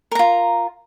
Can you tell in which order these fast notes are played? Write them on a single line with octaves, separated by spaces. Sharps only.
A#4 A#5 F4